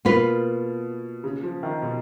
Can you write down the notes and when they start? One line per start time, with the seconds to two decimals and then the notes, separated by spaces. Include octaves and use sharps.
0.05 B2 A#3 F4 B4
1.24 C#3
1.43 F3
1.63 D#3
1.82 B2